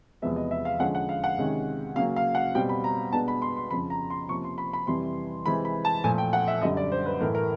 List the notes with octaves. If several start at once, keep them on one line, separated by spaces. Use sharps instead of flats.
E2 C3 F3 G#3 B3 E5
D#5
E5
F5
D3 F3 G#3 C#4 F#5
F#5
F5
F#5
C3 D#3 G#3 C#4
C#3 F#3 A#3 C#4 F5
F5
F#5
B2 G3 C4 G5
B5
A#5
B2 G#3 B3 D4 A5
B5
C6
C6
F2 C#3 F3 B5
A#5
C6
C3 F3 A#3 C#4 C#6
C6
B5
B5
F2 C3 E3 G3 C6
C3 E3 G#3 C4 B5
B5
A5
A#2 F3 A3 G#5
G5
F#5
E5
F#2 D3 G3 D#5
D5
C5
B4
A2 E3 A3 A#4
A#4